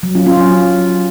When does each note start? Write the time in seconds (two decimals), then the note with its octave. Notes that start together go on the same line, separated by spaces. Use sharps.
0.03 F#3
0.15 C#4 F4
0.26 C#4 F4
0.37 F#3